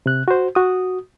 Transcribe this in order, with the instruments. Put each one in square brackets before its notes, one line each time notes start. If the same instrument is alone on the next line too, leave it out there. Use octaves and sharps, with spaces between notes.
[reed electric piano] C3 F#6
F#4 C5
F#4 D#6